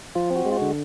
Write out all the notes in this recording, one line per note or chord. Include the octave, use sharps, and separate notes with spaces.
F3 F4
C4
F#4
G#3
F4
F#4
D3